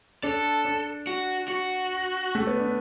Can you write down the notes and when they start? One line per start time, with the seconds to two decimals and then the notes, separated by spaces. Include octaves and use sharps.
0.23 D4 A4
0.65 D4
1.07 F#4
1.48 F#4
2.35 A3
2.47 B3
2.60 D4